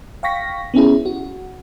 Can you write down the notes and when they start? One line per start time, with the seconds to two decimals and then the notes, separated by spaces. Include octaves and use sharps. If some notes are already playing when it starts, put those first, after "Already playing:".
0.23 F5 G5 C#6 A#6 B6
0.74 B3 C#4 E4 G#4
1.06 F#4